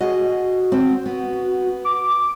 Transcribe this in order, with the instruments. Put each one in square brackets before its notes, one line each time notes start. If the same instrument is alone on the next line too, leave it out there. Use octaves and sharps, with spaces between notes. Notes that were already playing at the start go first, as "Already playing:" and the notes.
[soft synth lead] F#4 [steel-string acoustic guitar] G#4 D#5
[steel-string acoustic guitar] C4
B3
[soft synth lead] D6